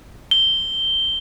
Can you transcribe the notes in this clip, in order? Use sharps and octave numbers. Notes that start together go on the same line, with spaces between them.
G7